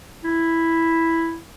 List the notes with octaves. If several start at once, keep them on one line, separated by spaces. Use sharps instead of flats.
E4